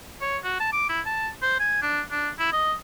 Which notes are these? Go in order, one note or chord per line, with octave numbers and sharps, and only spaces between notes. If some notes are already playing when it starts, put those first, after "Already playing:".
C#5
F#4
A5
D6
E4
A5
C5
G#5
D4
D4
E4
D#5